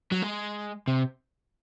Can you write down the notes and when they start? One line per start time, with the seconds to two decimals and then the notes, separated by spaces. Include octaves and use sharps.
0.12 F#3
0.22 G#3
0.88 C3